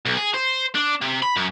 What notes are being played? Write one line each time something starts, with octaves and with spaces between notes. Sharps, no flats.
B1
G#4
C5
D4
C3
B5
F#2